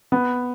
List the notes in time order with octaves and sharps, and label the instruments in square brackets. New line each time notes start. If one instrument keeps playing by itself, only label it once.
[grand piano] B3